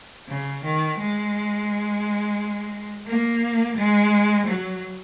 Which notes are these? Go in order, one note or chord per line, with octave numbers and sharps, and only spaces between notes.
C#3
D#3
G#3
A#3
G#3
F#3